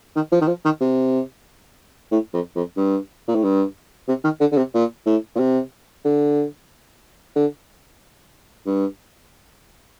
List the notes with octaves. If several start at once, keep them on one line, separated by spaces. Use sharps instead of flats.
D#3
F3
D#3
F3
D#3
C3
A2
F2
F2
G2
A#2
A2
G2
C3
D#3
D3
D3
C3
A#2
A2
A#2
C3
D3
D3
G2